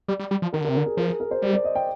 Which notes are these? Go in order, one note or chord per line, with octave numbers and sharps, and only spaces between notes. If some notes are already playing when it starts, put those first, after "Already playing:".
G3 D5
G3
G3
F3
D#3 A#4
D3
A#4
C3
D3 A#4
G#4
F3 A#4
G#4
A#4
C5
G3 D5
D5
D#5
G5